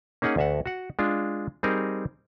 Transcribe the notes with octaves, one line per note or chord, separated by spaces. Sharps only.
A#3 C#4 D#4 G#4 F#5
D2 E5 F#5
F#4 F#5
G#3 D4 F4
G3 C4 D#4 G#4 A#4